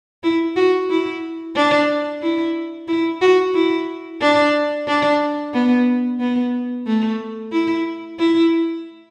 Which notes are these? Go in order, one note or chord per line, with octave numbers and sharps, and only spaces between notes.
E4
F#4
E4
D4
E4
E4
F#4
E4
D4
D4
B3
B3
A3
E4
E4